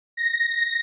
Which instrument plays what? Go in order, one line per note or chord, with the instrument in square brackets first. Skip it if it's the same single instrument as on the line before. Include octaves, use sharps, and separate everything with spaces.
[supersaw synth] A#6